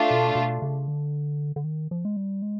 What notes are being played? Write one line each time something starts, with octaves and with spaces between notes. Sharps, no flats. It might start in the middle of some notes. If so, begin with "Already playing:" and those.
Already playing: A3 D4 F4
B2
B2
C#3
D3
D3
D#3
F3
G#3
G3
G#3